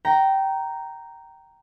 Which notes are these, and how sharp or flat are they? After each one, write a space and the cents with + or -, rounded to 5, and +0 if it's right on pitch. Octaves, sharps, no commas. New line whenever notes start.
G5 -15 A#5 +0